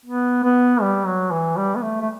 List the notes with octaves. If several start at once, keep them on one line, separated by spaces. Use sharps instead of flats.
B3
B3
G3
F#3
E3
G3
B3
A3
A3